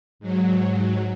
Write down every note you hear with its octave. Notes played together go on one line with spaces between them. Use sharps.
G#2 F#3